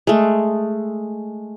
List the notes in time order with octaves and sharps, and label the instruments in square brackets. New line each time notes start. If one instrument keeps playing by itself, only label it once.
[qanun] G#3 A3